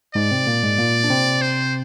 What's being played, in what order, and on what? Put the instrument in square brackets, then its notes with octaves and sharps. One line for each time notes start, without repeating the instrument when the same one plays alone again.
[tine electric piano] G#2 G#3 [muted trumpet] D5
[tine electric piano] C3 C4
A#2 A#3
G#2 G#3
A#2 A#3
D4
C3 C4
[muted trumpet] C5